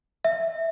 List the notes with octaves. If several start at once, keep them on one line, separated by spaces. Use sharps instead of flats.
E5